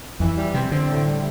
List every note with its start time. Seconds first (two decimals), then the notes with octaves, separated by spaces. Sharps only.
0.20 F2 E3
0.37 G3
0.54 C3 C4
0.72 D3 C4
0.89 A2
1.07 G3